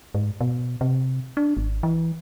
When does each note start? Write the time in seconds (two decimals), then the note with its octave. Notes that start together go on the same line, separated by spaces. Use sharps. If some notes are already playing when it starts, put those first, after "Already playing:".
0.15 G#2
0.41 B2
0.81 C3
1.37 D4
1.57 G#1
1.83 E3